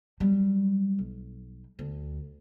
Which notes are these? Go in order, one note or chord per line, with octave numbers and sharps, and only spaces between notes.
F#3 G3
B1
D2